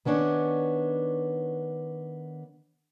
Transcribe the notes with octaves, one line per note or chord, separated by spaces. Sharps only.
D#3 B3 C#4 D4 C#5